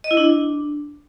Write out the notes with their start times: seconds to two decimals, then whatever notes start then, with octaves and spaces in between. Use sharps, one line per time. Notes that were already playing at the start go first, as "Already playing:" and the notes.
0.04 D#5
0.11 E4
0.17 D4